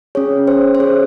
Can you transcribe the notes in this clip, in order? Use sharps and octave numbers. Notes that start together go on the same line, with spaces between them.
C#4 G#4 C#5
C5
C5
C#4 G#4 C#5